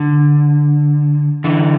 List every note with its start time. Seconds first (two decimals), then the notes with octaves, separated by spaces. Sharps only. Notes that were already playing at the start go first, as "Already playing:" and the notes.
Already playing: D3
1.44 D3 E3